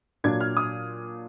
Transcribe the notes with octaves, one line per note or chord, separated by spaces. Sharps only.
A#2 F#3 D4 F4 G#6
F6
D#6